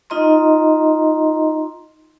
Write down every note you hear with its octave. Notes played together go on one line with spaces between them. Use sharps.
D#4 F4 D#5 A#5 C6